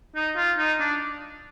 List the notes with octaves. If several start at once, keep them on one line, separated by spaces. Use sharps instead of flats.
D#4
F4
D#4
D4